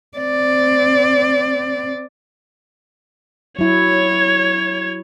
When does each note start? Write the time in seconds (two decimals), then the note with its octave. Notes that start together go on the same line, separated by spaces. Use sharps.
0.17 C4 D5
3.59 F#3 E4 C#5 G#6